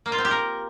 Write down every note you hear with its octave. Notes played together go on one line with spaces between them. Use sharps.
A#3
F4
C4
G4
A#4